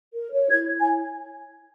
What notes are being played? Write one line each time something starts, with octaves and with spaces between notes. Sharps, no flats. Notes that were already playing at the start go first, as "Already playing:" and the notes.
A#4
C#5
E4 G#6
E4
G#5